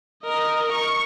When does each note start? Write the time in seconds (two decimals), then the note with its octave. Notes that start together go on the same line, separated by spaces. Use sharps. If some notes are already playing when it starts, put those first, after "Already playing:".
0.24 A#4 D#5
0.73 C#6